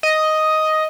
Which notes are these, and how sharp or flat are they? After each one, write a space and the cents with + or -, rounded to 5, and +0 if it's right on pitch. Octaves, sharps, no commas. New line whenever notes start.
D#5 +5